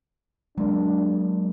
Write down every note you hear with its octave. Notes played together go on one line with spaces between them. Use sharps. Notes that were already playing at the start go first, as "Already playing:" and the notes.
F#3 G#3 A#3 D4